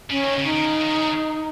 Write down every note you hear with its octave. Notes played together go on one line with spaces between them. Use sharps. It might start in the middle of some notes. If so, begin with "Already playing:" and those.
C#3 C#4
D#3
C#3
D#4
D#3
C#3
D#3
C#3